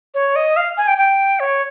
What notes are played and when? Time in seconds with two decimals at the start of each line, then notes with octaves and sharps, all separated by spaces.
0.14 C#5
0.36 D#5
0.57 F5
0.77 G#5
0.88 G5
0.98 G5
1.40 C#5